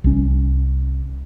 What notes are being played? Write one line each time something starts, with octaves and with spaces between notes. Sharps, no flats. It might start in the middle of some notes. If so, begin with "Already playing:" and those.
C2 C#4